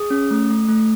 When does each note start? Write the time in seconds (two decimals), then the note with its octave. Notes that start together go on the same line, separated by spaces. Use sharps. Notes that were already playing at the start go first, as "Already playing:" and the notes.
Already playing: G#4 D#6
0.10 C#4
0.31 A3
0.50 A3
0.68 A3